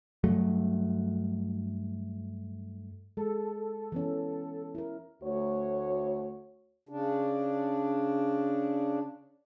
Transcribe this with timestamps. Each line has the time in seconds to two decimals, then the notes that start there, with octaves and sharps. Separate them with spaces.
0.24 G2 F#3 A3
3.17 G#3 A4
3.92 E3 B3 C#4
4.75 E4 A#4
5.22 D2 A3 F#4 C#5
6.89 C#3 D4